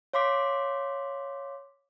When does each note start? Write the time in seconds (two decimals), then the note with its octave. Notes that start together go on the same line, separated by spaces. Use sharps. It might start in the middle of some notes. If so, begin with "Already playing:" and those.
0.13 C#5 F5 C6 D6 B6